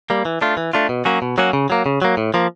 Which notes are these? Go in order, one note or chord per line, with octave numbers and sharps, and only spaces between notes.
G3 A#3
E3
A3 D4 F4
E3
A3 D4 F4
B2
F#3 A#3 C#4 F#4
B2
F#3 A#3 C#4 F#4
C#3
F#3 A#3
C#3
F#3 A#3
A2
F3 A#3